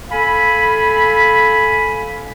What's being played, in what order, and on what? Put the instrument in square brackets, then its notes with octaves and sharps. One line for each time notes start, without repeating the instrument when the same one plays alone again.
[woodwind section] A4 F5 G#5 B5